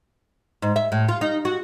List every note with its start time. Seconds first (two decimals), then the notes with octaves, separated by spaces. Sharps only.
0.62 G#2
0.76 E5
0.92 A2
1.09 F4
1.21 D#4
1.45 F#4